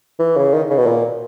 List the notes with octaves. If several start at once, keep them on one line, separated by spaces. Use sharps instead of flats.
E3
C#3
D#3
C#3
B2
A#2